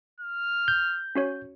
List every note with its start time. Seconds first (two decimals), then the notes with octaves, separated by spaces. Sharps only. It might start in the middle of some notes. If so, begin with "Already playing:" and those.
0.20 F6
0.68 G6
1.15 C#4 F#4 C#5